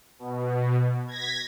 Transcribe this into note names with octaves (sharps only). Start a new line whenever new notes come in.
B2
G#6 A#6 B6